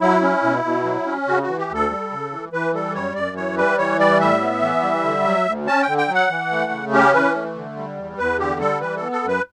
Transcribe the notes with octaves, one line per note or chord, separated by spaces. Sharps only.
F#3 E4
C#4
B2
B2
F#3
C#4
C#3 F#4
F#4
E3
G4
D2 A4
G3
C#3
E3
E3 B4
G3 A4
F#2 C#5
F#2 D5
E3 C#5
G3 B4
E3 C#5
G3 D5
A2 E5
B3
E3
G3
D3
F#3
D2
C#4 A5
G5
D3
G5
F#3
F#5
E3
A3
C#3
C#4 G4
E3 B4
A3
D3
G3
E2
E2 B4
D3 G4
G3 A4
E3 B4
A4
B3
A4
F#2 B4